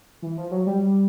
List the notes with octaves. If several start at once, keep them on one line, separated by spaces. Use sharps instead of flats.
E3
F3
F#3
G3